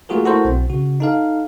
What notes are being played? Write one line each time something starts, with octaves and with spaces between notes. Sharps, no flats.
A3 A#3 F4 F#4 G#4 A#4
A3 E4 F#4 A4 A#4 C5
B1 C4
C#3 F#4
D#4 A4 F5